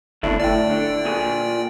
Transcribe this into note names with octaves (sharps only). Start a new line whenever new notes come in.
G1 A3 D4 E4
A2 D5 G5
D3
A#2 G#4